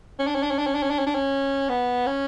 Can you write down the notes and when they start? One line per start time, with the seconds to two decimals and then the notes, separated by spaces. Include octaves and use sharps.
0.19 C#4
0.27 D4
0.35 C#4
0.43 D4
0.51 C#4
0.58 D4
0.66 C#4
0.75 D4
0.83 C#4
0.90 D4
0.99 C#4
1.06 D4
1.14 C#4
1.69 B3
2.07 C#4